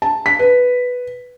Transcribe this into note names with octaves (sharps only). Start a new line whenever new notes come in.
A5
B6
B4